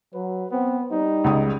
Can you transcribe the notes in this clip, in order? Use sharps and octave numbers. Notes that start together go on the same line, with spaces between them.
F#3 B4
B3 C4
G3 D#4
C#2 C#3 D#6